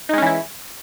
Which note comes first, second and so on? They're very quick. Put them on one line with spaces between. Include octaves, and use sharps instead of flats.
D#4 G#3 C#4 E3 E4